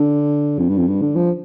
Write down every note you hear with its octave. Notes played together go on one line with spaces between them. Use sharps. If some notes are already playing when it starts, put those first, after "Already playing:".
Already playing: D3
F2
G2
F2
G2
D3
F3